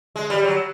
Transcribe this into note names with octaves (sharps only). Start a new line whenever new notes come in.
G#3
G3
F#3